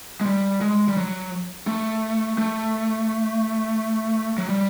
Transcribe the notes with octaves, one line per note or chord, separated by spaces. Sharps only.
G#3
G3
G#3
G3
F#3
A3
A3
F#3
G3